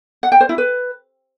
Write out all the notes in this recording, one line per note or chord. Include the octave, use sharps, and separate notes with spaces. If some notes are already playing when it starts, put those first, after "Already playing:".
F#5
G5
C5
E4
B4